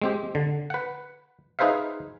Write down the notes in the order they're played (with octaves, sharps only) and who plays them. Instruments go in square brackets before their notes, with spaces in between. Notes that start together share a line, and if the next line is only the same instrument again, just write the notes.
[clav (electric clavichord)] G#3 C4 G4
D3
B4 F#5
D#4 G#4 B4 C5 E5 F5